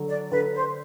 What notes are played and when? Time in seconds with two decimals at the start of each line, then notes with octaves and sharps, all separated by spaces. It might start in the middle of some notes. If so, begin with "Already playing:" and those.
Already playing: D3 F#3
0.08 D5
0.31 D3 B4
0.55 C5